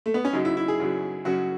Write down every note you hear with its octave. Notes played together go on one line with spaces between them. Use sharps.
A3
B3
C#4
F#2 C#3 F#3 D#4
E4
E4
G#4
F#2 C#3 F#3
F#2 C#3 F#3 F#4